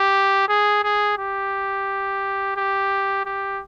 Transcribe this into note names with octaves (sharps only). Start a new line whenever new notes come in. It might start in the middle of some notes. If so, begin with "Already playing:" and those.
Already playing: G4
G#4
G#4
G4
G4
G4